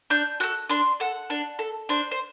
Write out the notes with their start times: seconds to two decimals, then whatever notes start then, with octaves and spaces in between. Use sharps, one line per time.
0.10 D4 G6
0.40 F#4 A4 F#6
0.69 D4 C6
1.00 A4 F#5
1.30 D4
1.59 A4
1.89 D4 C5
2.11 C5